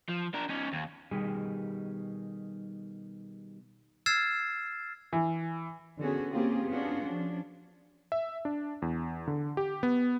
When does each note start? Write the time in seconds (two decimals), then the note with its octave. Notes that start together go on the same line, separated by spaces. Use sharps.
0.09 F3
0.34 D4 A#4
0.49 C#4 D#4
0.73 D#2
1.11 B2 D#3 G3 G4 G#4 G#5
4.06 E6 F6 G#6 A6 C7 E7
5.13 E3
5.99 D3 B3 C#4 F#4 G#4
6.32 A#3 C4 C#4 F4 G4 G#4
6.67 B3 C#4 D4 F4 F#4 G#4
7.01 F3 C#4 D4
8.12 E5
8.45 D4
8.82 E2
9.28 D3
9.57 G4
9.83 B3